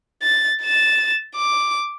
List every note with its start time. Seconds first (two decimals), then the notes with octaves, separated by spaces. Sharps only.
0.22 A6
0.62 A6 E7
1.36 D6